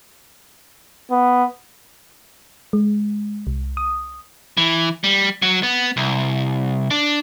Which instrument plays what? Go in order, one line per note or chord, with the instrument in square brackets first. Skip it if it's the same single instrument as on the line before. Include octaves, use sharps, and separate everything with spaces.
[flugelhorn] B3
[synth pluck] G#3
C2
D#6
[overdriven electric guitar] E3
G3
F#3
B3
C2
D4